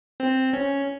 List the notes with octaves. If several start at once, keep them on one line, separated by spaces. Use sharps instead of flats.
C4
C#4